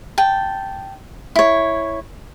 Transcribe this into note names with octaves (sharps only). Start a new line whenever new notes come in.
G5 A5
E4 C#5